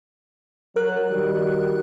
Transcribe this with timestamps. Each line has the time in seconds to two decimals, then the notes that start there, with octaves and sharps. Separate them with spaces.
0.76 F#3 A#4 F#6
1.10 D#3 G3 F#4